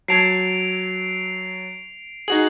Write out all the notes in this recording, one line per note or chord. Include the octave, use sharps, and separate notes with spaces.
F#3 A5 G#6 C7 D7 F7
D#4 F#4 G#4 F#7